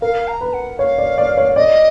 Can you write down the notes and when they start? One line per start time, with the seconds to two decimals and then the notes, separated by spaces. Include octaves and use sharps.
0.02 A#4 F5
0.28 A#5
0.41 B4
0.53 F#5
0.79 C#5 F5
0.99 D5
1.18 D5
1.37 C#5
1.56 D5 D#5